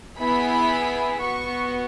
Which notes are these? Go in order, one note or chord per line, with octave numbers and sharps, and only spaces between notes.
B3 E4 G#4 B5
B3 F#4 C#6